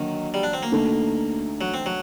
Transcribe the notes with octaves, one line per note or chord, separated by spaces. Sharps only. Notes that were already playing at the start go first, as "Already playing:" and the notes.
Already playing: D3 D#3 F#3 A#3 F#4
G3
D4
C4
A#3
D2 D3 A3 D#4 A4
F#3
C4
F#3